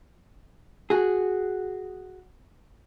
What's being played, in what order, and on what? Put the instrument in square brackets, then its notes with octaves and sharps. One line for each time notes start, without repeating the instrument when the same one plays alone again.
[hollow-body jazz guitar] F#4 G#4